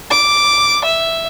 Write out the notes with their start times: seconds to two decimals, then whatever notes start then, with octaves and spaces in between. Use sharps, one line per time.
0.11 D6
0.85 E5